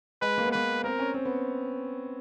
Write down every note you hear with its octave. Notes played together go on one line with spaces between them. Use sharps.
G#3 B4
A#3
B3
A#3 B4
C4 A#4
C#4
C4
B3